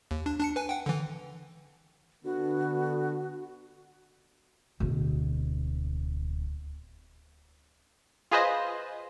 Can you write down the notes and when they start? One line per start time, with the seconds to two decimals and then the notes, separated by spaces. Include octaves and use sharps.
0.11 D#2
0.26 D4
0.40 D4 A5 C#7
0.56 B4 G#5
0.69 F#5 G5
0.86 D3 E3
2.25 D3 B3 F#4
4.80 D1 B2
8.31 F4 G#4 B4 C5 D#5